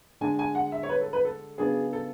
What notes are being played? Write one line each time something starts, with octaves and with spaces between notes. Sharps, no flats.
D3 G#3 D4 G#5
G#5
F#5
E5
C#5
B4
A4
B4
A4
C#3 F#3 B3 D4 G#4
A4